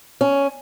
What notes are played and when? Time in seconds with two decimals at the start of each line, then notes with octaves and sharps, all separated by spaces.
0.21 C#4